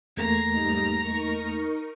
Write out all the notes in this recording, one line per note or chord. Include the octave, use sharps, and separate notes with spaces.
E2 A3 A#3 A#5 G#6 C7
G#2 G3 D#4
D#4 A#4 C#6